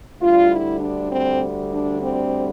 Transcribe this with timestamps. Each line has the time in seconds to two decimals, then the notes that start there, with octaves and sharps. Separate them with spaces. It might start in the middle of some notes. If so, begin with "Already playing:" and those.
0.21 D2 D3 G3 F4
0.50 E4
0.80 D4
1.11 C4
1.71 D4
2.00 C4